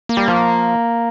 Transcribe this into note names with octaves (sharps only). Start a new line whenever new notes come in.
A#3
G3
F3